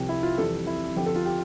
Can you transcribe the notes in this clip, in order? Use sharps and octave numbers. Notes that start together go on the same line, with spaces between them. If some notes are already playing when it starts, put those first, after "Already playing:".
Already playing: C2 C3 F3 G4
E4
F4
F2 C3 E3 G3 A4
E4
F2 D3 F3 G4
A4
F4
G4